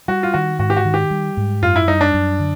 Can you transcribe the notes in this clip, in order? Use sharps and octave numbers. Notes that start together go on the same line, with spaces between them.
G3 F#4
F4
D#3 F#4
G#2 F#4
G4
F#4
D#3
G4
G3
G#2
F#2 F4
E4
G3 D#4
D4
F#2
D3